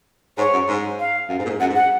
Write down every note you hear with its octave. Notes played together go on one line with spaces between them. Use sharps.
G#2 C#5
F#2
G#2
F5
F#2
G#2
A#2
G#2
F#2 F#5
G#2
F#5